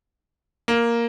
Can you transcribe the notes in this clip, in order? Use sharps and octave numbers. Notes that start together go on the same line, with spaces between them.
A#3